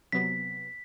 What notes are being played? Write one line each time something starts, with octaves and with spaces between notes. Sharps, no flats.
C3 F#3 B3 B6